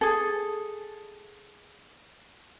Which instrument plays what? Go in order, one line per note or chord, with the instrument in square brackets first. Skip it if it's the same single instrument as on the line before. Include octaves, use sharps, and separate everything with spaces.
[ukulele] G#4 A4